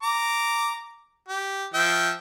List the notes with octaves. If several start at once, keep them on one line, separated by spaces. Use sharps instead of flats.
A#5 D6
G4
F3 E5 G5